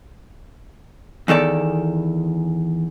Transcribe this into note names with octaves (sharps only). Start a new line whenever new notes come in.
E2 D#3 A4 D5